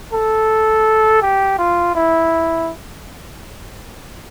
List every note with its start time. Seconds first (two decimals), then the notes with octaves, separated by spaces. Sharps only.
0.13 A4
1.22 G4
1.58 F4
1.95 E4